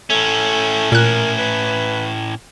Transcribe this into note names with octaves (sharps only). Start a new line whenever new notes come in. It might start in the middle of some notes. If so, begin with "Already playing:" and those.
A2 A3 C#4
A#2 A#4 F#6
B4